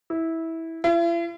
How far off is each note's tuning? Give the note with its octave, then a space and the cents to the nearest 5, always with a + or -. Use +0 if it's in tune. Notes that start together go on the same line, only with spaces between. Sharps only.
E4 -15
E4 +45